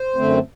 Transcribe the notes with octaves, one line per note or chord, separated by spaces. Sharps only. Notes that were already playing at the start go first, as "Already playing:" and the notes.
Already playing: C5
F#2 D3 A3 C4